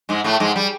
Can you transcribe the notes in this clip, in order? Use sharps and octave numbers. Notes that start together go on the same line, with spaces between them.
G#2 G#3
A2 A3
G#2 G#3
G3